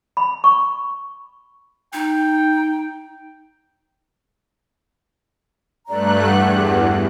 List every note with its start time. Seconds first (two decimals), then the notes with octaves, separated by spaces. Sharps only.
0.17 B5
0.44 C#6
1.93 D#4 G5
5.88 G2 A3 D5 A#5 F#6
6.25 E2 G4 F#5